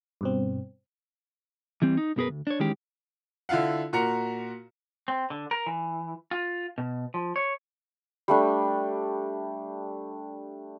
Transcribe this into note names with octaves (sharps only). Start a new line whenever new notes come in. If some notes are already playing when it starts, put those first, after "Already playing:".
G2 B2 C4
E3 G3 C4
D#4
B1 F#2 B3 G#4 A#4 B4
D2
D4 C#5
D#3 E3 G#3 C#4 G4
D3 E4 F4 F5 F#5
A#2 F#4 A#4 A#5 C#7
C4
D3
A#4
E3
F4
B2
F3
C#5
G3 A3 D4